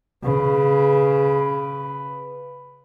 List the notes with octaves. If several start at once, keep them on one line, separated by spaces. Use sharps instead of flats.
C#3 B4